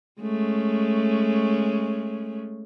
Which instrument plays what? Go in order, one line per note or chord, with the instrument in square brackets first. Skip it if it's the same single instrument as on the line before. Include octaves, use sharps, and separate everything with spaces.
[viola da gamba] G#3 A3 C#4